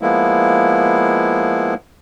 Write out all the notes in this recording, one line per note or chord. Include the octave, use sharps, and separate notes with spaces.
F3 G#3 A#3 B3 E4